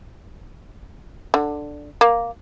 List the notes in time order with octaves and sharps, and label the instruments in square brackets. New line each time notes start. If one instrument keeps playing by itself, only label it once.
[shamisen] D3
A#3